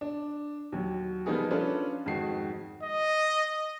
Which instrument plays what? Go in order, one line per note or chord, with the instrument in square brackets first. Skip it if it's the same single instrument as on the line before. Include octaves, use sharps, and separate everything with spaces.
[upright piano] D4
D#2 F#3
F3 G3 A#3 B3 D#4 G#4
C#4 D4 F4 A4 B4
F2 G#2 D#3 G#3 F#4 C7
[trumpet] D#5